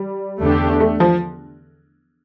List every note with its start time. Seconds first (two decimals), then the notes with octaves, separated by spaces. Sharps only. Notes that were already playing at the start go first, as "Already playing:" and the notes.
Already playing: G3
0.41 E2 D3 A3 D4 G4
0.80 A3
1.00 F3